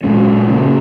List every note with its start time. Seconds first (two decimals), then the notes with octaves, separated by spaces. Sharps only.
0.04 A#2 G#3 C#4
0.49 C#3 A#3 C#4